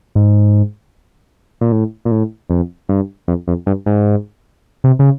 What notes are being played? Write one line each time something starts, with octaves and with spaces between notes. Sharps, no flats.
G#2
A#2
A2
A#2
A2
F2
G2
F2
F2
G2
G#2
C3
C#3